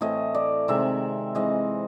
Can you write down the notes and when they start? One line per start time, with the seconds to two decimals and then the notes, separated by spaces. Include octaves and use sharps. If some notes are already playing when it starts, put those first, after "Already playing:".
0.01 A2 E3 A3 C4 D#5
0.35 D5
0.68 C3 D#3 G#3 C4 E5
1.35 E3 G#3 C4 D#5